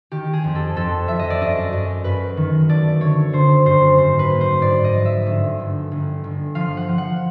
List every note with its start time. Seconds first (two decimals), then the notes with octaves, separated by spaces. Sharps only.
0.11 D#3 G4
0.33 G#4
0.44 F2
0.55 A4
0.76 F2 A4
1.08 F2 E5
1.19 D#5
1.30 D5
1.41 F#2 D#5
1.73 F#2
2.04 F#2 B4
2.37 D#3
2.69 A3 D5
3.01 D3 C#5
3.33 D3 C5
3.66 F#2 C5
3.97 G#2 C5
4.19 B4
4.30 A#3
4.41 C5
4.62 G#2 D5
4.84 D#5
4.94 F3
5.05 E5
5.26 G1
5.59 G1
5.92 G1
6.24 G1
6.55 F3 F5
6.77 F#5
6.88 F3
6.98 F#5